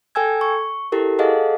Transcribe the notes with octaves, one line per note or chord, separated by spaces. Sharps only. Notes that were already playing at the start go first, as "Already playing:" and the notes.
A4 G5 G#5 E6 G#6
C#6
E4 G4 A4 A#4
G#4 A4 D#5 F5 F#5